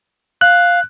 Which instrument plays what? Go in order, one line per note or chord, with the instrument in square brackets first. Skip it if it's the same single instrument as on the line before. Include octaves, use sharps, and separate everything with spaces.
[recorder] F5 [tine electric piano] F#6